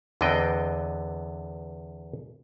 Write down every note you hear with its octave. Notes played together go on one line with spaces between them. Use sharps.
E2 D3 B3 C4 D#5 G5